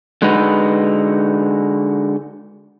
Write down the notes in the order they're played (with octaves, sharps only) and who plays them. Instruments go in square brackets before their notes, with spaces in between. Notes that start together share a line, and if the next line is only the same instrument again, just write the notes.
[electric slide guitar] D3 G#3 D#4 F#4 B4